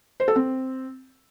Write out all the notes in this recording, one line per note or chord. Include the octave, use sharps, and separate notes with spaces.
C5
A4
C4